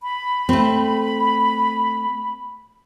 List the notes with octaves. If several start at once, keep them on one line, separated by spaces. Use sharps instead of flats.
B5
A3 C4